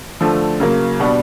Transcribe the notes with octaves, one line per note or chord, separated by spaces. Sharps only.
D3 F3 A3
C#3 F#3 A#3
B2 G3 B3 D4